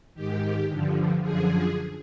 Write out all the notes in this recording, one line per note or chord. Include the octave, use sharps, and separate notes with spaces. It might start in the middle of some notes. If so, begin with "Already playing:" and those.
G#2 D#3 G4
G2 D3 F3
F#2 D3 F3 G#4